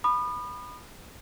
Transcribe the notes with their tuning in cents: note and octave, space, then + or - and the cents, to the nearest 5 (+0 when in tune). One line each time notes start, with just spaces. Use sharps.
B5 +0 D#6 -35